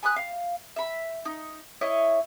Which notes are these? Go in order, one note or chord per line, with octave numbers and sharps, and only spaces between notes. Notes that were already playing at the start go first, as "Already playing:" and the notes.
G#5 B5 D#6 F#6
F5
E5 B5
D#4
E4 C#5 D#5